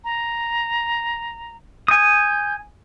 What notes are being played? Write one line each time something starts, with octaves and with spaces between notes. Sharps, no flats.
A#5
G#5 D#6 G6